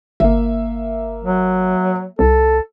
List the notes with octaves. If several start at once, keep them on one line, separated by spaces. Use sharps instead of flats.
G1 A#3 E5
F#3
C2 A4